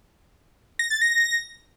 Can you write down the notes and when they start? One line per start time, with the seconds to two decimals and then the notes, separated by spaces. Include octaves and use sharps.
0.79 A#6
0.90 A6
1.02 A#6